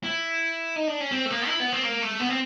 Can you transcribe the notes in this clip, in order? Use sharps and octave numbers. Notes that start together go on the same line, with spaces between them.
E4
D#4
D4
C#4
C4
A3
A#3
E4
B3
C4
A#3
A3
B3
C4